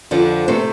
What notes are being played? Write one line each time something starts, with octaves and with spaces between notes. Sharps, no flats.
F2 D3 F3
C3 A3 C4 C5